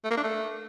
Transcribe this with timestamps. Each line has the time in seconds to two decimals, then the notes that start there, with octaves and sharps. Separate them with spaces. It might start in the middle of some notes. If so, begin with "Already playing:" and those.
0.04 A3
0.11 A#3
0.17 D4
0.24 A3